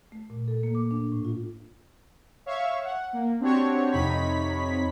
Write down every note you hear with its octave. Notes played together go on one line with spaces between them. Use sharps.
A3
A#2
A4
A#3
D6
D4
A2
F4
C#5 E5 F5 C#6
F#5
A#3
C4 D4 F#4 G4 C#5
F2 C3 D#4 C#5 B5 B6